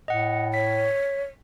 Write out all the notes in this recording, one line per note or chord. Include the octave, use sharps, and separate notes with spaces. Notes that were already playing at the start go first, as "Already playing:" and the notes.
A2 D#5 F#5
C#5 B6